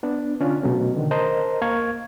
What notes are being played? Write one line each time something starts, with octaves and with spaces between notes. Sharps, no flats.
B3 D4
D3 C#4 D4 F4
B2 F#3 A3 C#4
D3 D#3
A#4 C5 D#5 A5 A#5
C#2 A#3 F5 C#6 G#6